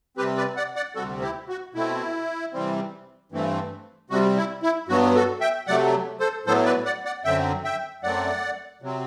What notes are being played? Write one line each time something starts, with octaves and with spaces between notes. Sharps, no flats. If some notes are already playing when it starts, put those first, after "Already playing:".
C3 G3 C4 G4 B4
B4 D5
D5 F#5
D5 F#5
D2 C3 G3 C4 F#4 A4
E4 G4
F#4
B2 A3 C4 E4
C3 E3 G3 C4
G2 E3 A3 C4
C3 G3 C4 F#4
E4
E4
G2 F#3 B3 F#4
F#4 A4
E5 G5
C3 F#3 A3 D5 F#5
A4 C5
A2 F#3 B3 A4 C5
B4 D5
D5 F#5
D5 F#5
F#2 D3 F#3 C4 E5 G5
E5 G5
F#2 F#3 A3 C4 D5 F#5
C3 F#3 C4